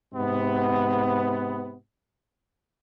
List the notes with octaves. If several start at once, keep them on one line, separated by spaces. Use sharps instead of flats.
G#2 C3 B3